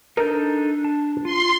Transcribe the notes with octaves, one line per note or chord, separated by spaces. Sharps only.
D4 D#4 A4 A#4 G6
A5
F4 C6